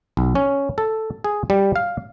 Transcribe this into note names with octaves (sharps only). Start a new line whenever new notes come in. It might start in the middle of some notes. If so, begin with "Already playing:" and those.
B1
C#4
A4
G#4
G3
F5